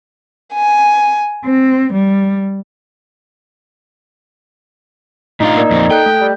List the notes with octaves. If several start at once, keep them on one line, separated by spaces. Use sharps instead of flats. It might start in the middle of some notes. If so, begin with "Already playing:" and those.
G#5
C4
G3
A2 D4 D#4 F4
A#3 A#4 D5
F2 A#2 C4
A4 G5 F#6 G6
A3 G6
G3